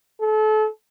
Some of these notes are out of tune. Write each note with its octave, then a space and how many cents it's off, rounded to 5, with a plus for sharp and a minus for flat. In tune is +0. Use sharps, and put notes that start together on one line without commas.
A4 -30